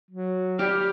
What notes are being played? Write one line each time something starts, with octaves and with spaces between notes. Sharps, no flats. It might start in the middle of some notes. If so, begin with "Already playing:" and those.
F#3
G3 G4 F6